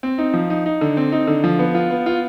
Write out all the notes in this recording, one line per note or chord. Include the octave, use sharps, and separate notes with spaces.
C4
D#4
F3
D#4
D#4
D3
C4
D#4
D3
F3
B3
F4
B3
F4